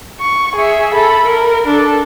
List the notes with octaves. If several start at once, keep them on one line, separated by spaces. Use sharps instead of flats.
C#6
G#4 E5
A4 B5
A#4
D4 A4